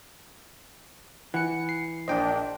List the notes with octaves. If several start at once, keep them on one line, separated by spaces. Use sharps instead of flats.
E3 F#5 C#7
C7
A#1 D4 C5 D#5 G5